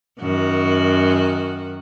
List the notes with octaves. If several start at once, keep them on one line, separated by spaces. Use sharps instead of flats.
F#2 D#3 F#4